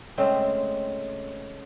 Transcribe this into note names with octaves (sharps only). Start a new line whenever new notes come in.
C#3 G#3 A3 C4